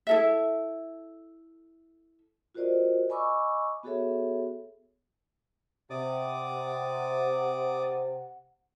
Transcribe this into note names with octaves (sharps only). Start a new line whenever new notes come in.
E4 A4 E5
F4 F#4 A#4 C5 D5 D#5
D#5 G#5 B5 C#6 D6 E6
B3 F#4 G#4 A4 C#5 E5
C3 D5 F#5 D6 D#6